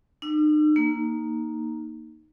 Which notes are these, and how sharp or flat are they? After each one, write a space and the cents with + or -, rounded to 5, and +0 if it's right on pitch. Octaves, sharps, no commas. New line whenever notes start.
D#4 -40 E6 +35
A#3 +0 D#4 +0